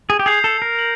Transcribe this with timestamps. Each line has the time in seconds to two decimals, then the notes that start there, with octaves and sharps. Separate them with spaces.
0.10 G#4
0.19 G4
0.26 G#4 G6 C7 F7
0.44 A4
0.62 A#4
0.79 F#7